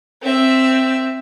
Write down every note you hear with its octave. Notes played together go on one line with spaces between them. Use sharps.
C4 E5